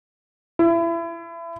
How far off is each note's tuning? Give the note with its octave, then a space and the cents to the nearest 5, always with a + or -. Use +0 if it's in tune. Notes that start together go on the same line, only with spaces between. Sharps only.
E4 +30